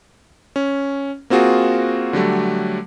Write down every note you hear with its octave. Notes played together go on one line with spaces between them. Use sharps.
C#4
A#3 C4 F4 F#4 G#4
D3 F#3 G3 A3